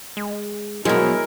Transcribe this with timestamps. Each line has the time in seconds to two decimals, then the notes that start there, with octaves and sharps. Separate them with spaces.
0.17 G#3
0.85 B2 F3 F#3 G#3 E4 A#4